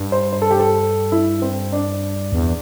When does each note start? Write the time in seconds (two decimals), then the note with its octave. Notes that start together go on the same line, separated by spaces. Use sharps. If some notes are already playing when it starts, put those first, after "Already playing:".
Already playing: G2
0.12 C5
0.33 C5
0.42 A4
0.51 G4
0.60 A4
1.12 E4
1.42 C4
1.72 D4
2.32 E2